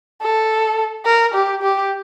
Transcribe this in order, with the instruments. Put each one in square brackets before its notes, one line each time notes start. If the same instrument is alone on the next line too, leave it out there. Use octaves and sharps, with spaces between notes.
[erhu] A4
A#4
G4
G4